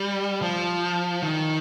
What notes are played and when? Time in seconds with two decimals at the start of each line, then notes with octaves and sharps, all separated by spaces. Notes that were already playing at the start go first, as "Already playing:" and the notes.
Already playing: G3
0.42 F3
1.22 D#3